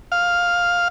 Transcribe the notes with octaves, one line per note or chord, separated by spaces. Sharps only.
F5